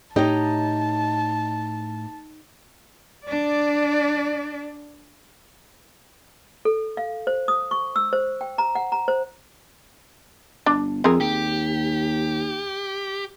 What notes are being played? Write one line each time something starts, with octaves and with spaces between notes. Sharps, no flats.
A2 D#4 G4 C#5 D#5 A5 A#5
D4 D5
A4
F5
C5
D#6
C#6
E6
C5
G5
A#5
F#5
A#5
C5
G1 D4
F2 C4 G#4 A#4
D#2 G4